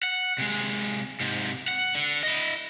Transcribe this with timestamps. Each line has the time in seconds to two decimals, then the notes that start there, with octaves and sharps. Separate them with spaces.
0.03 F#5
0.38 C3 G#3
1.20 G#2 C3
1.68 F#5
1.95 D3
2.23 E4 D#5